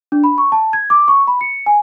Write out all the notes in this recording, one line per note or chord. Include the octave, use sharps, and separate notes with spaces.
D4
B5
C#6
A5
G#6
D6
C#6
B5
C#7
G#5